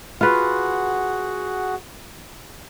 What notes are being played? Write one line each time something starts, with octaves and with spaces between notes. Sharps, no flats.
F4 F#4 G#4 B4 F#5